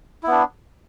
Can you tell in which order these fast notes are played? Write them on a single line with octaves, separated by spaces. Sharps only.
E4 B3 D4